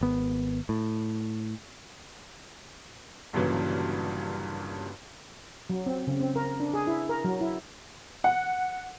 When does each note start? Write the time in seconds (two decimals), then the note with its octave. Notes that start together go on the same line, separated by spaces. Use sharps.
0.01 G#1 B3
0.69 A2
3.33 G1 G2 A#2 C#3 E3 F#3
5.70 F#3
5.86 C4
6.07 C#3
6.20 C4
6.36 A#4
6.60 D4
6.74 G#4
6.87 E4
7.09 A#4
7.24 F#3
7.41 E4
8.24 F#5